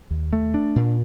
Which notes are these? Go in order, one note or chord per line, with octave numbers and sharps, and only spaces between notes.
D#2
A3
D4
A#2